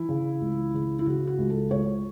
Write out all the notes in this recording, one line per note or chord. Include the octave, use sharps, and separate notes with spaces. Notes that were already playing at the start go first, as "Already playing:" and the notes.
Already playing: E3 E4
C#3
C#2
C#3
E4
C#3 F#4
F#4
C#2
A4
C#2 C#5